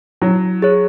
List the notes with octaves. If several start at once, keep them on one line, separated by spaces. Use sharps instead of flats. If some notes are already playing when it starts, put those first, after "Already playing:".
F#3 E4
G#4 C#5